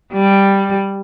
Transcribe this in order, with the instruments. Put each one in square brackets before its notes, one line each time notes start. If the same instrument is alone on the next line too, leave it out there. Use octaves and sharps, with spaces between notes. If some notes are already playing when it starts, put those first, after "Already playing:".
[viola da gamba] G3